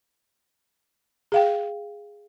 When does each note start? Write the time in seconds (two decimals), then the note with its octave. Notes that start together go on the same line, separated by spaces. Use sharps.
1.32 G#4 F5 G5